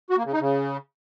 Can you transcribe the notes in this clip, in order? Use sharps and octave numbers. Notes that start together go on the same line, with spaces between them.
F#4
A#3
C#3
D#4
C#3